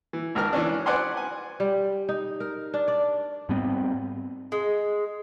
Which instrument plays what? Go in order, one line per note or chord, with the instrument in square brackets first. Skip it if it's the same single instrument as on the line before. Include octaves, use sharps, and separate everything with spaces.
[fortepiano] E3
G#1 C#2 A#4 F6
E3 C#4 D4
B4 C5 D5 F#5 G#5 C6
G#5
[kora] G3
D#4
A#4
D4
D5
[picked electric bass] G#2 G3 B3 C4
[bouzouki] G#3